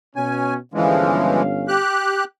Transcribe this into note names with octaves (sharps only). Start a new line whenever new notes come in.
B2 C#4 G#5
G1 E3 F3 G#3 C#4 F5
G4 F#6